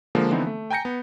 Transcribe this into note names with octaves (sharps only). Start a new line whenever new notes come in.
D3 F3 G#3 A#3
D3 E3 F3 B3 C4 D#4
A3
G5 G#5 A#5 G6 A#6 C#7
B3